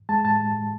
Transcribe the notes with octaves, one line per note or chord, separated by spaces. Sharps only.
G#3 A5
A2 A5